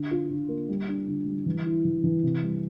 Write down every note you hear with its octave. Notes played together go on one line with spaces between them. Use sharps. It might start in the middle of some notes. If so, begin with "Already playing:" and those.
Already playing: D3
F4
D3
A#3
G3
D4
D3
G3
E3
E4
E3
E3
C3
G3